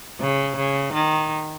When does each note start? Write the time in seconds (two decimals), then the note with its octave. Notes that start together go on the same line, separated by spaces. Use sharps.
0.20 C#3
0.57 C#3
0.93 D#3